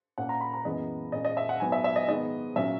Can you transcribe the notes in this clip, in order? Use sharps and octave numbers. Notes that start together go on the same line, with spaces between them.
A#2 A#3 C#4 F#5
A#5
B5
A#5
F#2 E3 G#3 B3 D#5
A#2 G#3 C#4 D#5
D#5
E5
F#5
G#2 F#3 B3 G#5
E5
E5
D#5
G#2 D#3 G#3 B3 D#5
A#2 F#3 C#4 E5